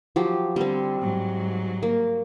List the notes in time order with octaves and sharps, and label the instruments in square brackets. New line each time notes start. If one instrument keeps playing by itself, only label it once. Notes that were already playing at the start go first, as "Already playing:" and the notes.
[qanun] F3 F#3 G4
[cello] D3 [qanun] G3 C4
[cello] G#2 F#3
[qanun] A#3